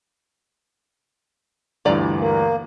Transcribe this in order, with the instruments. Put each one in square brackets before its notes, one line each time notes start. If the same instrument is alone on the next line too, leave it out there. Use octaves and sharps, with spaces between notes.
[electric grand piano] D2 G2 E3 [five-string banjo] F4 D5 A#5
[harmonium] A#3